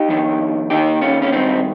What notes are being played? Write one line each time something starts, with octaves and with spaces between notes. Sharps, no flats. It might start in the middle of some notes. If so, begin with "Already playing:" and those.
Already playing: D#4 G4
F2 D#3
D#2 D#3 D#4 G4
C#4 F4
C#4
G2 D#3 C4 D#4